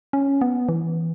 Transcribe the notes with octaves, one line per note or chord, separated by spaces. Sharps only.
C#4
B3
E3